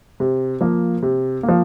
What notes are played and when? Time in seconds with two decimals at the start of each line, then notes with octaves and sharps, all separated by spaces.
0.20 C3
0.61 F3 A#3
1.02 C3
1.43 A#3
1.49 F3